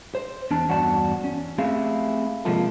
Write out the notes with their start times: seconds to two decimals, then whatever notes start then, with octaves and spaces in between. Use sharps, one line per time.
0.15 C5
0.51 E2 D4 A5
0.68 E2 G2 F#4 D5 A5
1.24 C#4
1.58 A3 C4 E4 G4 G#4 F5
2.45 C3 F3 G#3 A#3 F4 A4